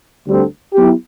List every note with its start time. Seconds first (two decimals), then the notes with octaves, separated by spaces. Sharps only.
0.25 D2 D3 G3 C4
0.74 F#3 B3 E4 G4